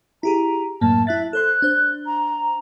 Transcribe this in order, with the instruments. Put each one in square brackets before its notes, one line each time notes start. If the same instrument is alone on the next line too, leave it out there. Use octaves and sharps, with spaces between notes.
[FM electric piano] E4 G4 G#4 [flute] A#5
[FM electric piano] F#2 A2 A#3 [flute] A5
[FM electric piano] E4 F#6 A6 [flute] E5
[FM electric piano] A4 C5 C6 [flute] F#6
[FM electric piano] D4 C5
[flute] A#5